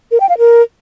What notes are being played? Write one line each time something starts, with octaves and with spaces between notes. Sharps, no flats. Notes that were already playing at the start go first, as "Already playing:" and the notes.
A#4
G5
F5
A#4